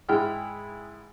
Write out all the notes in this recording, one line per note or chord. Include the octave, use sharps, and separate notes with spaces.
G#2 E4 G#4 G5 F6